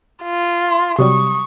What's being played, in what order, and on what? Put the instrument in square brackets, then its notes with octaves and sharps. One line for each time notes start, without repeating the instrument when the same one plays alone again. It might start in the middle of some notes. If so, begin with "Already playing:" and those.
[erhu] F4
[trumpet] C6
[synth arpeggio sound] C3 F#3 G3 [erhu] C#6 [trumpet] D#6